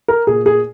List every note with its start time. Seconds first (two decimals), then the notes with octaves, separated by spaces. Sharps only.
0.08 A#4
0.27 A#2 G#4
0.46 G#4